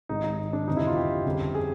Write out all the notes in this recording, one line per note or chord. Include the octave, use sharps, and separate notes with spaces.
G#1 G#2 D#3 D#4
D#4
D4
G1 F2 C3 D#4
E4
F4
G4
G1 F2 C#3
G#4